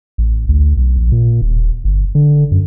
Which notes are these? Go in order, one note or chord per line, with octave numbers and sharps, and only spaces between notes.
A1
D2
B1
A#1
A#2
D#1
G1
D3
F#2